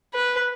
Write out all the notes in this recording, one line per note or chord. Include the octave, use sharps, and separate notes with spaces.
B4